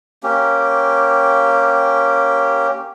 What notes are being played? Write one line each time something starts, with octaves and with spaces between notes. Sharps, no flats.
A#3 C#4 G4